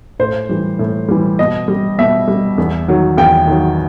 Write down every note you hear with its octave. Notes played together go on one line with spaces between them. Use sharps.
A2 C5
E3 G3
A2
E3 G3
B2 D#5
G3
B2 E5
G3
E2
D#3 F#3
E2 G5
D#3 F#3